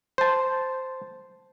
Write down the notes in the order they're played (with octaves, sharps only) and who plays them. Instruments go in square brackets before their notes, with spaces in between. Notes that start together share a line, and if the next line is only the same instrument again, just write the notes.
[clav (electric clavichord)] C5 A5